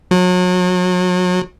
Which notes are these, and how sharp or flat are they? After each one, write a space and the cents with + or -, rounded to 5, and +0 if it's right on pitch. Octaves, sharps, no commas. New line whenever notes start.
F#3 -35